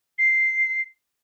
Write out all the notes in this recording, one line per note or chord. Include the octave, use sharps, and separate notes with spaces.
C7